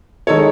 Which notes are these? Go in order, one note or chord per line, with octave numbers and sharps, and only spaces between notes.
D#3 G#3 D#4 A4 C#5